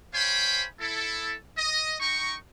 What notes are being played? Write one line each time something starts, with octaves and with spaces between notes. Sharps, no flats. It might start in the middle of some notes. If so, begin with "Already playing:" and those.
C5 C#5 F5 G5 G#5 B5
E4 A4
D#5
D#4 G5 A#5 C#6